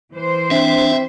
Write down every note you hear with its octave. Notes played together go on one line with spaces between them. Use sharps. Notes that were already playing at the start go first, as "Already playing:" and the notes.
E3 C5
C4 D4 E5